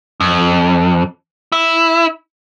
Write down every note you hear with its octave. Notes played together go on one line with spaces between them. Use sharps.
F2
E4